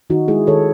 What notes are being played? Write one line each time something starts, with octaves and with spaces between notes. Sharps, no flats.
D#3 D#4 F#4
G#3 E4 G#4
D#3 A4 C#5